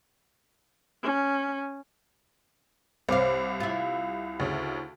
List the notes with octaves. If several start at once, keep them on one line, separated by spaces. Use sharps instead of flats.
C#4
C2 C5 F5 D6
E4 F4
D2 C#3